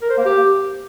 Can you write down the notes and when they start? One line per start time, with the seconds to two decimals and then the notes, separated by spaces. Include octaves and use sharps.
0.02 A#4
0.10 C5
0.18 A#3
0.25 G4